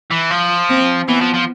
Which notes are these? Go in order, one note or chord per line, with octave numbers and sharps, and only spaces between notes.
E3
F3
C4
E3 B3
F3
F3